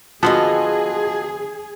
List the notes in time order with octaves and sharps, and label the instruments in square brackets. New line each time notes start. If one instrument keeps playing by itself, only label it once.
[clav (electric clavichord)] D3 F3 B3 [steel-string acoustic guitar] F4 F#4 D#5 [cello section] G#4 [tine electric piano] A5